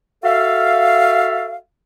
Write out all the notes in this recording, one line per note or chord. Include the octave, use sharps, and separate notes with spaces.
F#4 A4 E5 F5